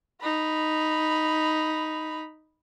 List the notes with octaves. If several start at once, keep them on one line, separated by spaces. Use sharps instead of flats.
D#4 B5